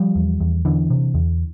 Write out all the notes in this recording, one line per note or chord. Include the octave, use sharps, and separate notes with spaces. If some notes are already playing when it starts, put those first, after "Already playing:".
Already playing: F3 G3
E2
E2
E2 D3 E3
C3
E2